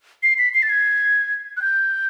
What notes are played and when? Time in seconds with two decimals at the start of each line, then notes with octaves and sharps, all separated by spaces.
0.23 C7
0.38 B6
0.54 C7
0.63 A6
0.69 G#6
1.57 F#6
1.62 G6